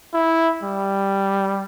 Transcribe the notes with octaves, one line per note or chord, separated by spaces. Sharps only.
E4
G3